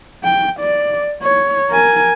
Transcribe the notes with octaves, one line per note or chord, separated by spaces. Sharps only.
G5
D5
C#5
A#4 G#5